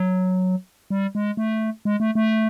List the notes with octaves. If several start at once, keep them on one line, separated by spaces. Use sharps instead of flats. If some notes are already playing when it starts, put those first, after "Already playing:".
Already playing: F#3
G3
G#3
A3
G#3
A3
A3